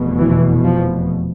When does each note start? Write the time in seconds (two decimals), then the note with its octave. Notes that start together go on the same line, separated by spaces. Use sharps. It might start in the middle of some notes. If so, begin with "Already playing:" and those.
Already playing: F1 E2 B2
0.19 E3
0.63 F3